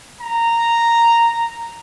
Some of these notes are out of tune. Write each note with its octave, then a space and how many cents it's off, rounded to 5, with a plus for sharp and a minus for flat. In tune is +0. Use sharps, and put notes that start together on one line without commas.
A#5 -5